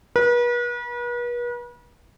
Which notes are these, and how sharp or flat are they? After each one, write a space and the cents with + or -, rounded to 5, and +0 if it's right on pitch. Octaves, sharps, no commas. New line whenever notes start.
B4 -40